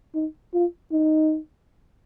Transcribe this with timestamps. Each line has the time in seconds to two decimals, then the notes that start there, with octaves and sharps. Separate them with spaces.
0.15 D#4
0.54 F4
0.92 D#4